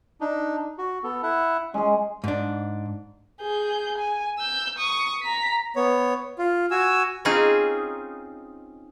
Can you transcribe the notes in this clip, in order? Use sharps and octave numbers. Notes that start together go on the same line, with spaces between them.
D4 D#4
F#4
B3 A4
E4 E5 F#5
G#3 C#4 G#4
G#2 D4
G#4 G6
G#5
E6 G6
C#6 D#6
A#5 B6
B3 C#5
F4
F#4 G#5 E6
C4 C#4 D#4 F4 G#4